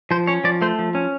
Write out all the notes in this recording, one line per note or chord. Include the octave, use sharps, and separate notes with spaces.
F3 C5
C#4 C#5
F3 D5
A3 C5
F3
C#4